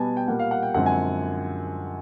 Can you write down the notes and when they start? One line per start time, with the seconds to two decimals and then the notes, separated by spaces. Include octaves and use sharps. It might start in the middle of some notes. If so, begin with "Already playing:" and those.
Already playing: B2 G3 B3 G#5 A5
0.17 G5
0.28 A#2 G3 A#3 F#5
0.39 F5
0.51 F#5
0.63 G5
0.74 F#2 D3 F3 G#3 C4 F#5
0.86 G#5